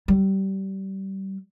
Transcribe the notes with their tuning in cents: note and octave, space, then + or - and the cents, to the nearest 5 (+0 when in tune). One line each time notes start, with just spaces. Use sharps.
G3 -25